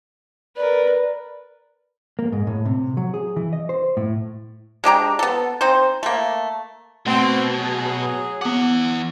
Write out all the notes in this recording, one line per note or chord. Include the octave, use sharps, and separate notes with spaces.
A#4 B4 D5
A#3
G#2
A2
C3
F#3
G#4
E3
D#5
C5
A2
G#3 D4 G4 A#5
B3 A4
C4 D#4 C5
A3 A#3
B2 A3 C4
F#3 G#4
E3 B3 F#5 D6